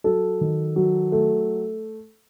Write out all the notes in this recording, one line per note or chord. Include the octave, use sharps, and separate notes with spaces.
F#3 A4
D#3
F#3
A3